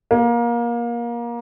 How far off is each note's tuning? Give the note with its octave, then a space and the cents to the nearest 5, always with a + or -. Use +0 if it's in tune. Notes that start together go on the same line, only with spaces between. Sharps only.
A#3 +25